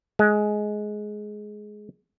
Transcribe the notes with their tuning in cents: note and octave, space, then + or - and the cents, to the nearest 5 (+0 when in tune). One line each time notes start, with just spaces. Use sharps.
G#3 +15